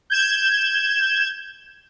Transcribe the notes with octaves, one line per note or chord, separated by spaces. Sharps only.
G6 G#6 E7